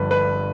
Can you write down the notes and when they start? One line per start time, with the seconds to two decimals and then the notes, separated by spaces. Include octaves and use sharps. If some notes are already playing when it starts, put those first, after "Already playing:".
Already playing: G1 G2 F3 B4
0.11 B4